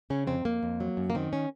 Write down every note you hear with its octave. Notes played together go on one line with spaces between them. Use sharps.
C#3 C#4
F2 C4
F2 A#3
F2
F#3
F#2
A#3
D#3 C4
C#4